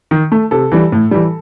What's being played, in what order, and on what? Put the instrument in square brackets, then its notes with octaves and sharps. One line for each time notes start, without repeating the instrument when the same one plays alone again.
[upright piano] D#3
A3
C3 A4
E3 G3
A2
E3 G3